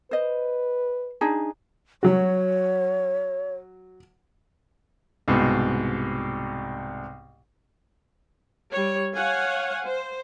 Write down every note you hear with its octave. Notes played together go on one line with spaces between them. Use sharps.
B4 C5 D#5
D4 D#4 G#4
F#3 F#4 C#5
C2 G#2 B2
G3 C#5
C#5 F5 F#5 G#5
C5